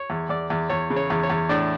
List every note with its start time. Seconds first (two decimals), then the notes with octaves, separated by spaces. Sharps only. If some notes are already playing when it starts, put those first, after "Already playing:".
Already playing: C#5
0.10 E2
0.29 E2 D5
0.50 E2
0.70 E2 C#5
0.90 C#3
0.96 C#5
1.10 E2
1.23 C#5
1.30 E2
1.49 A2 D4